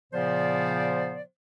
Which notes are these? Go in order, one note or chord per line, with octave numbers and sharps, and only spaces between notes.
A#2 C#3 F3 B3 C5 D5